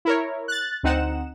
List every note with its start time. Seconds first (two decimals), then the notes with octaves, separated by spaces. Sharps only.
0.05 E4 A#4 C#5
0.48 F#6 A6
0.83 D2 C4 D#4 F#5 E7